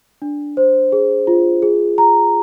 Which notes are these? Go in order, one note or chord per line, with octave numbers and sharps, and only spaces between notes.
D4
C5
G#4
F4
G#4
A#5